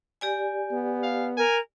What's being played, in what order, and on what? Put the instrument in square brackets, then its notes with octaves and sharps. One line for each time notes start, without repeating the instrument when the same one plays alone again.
[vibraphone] G4 D5 G#5
[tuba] B3
[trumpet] F5
[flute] A#4 [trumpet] G#5